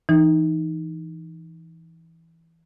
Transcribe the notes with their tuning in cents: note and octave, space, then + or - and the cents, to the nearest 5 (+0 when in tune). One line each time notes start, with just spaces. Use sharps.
E3 +0 D#4 +0